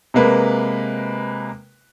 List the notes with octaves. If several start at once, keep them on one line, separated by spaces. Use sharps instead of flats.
C3 G#3 A#3 B4